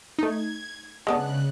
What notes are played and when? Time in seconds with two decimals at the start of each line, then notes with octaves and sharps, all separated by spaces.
0.19 A3 D#4 G#6
1.07 C#3 G#3 B3 D4 F#6